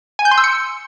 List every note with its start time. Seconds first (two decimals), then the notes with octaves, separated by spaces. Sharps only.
0.19 G#5
0.25 G6
0.31 C6
0.38 E6
0.44 C#7